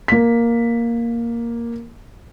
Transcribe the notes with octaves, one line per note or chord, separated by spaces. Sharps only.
A#3 B6